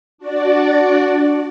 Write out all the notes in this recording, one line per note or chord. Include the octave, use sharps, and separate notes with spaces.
D4 F#4 D5